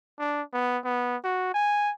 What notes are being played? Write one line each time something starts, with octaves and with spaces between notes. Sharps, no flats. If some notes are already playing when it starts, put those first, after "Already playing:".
D4
B3
B3
F#4
G#5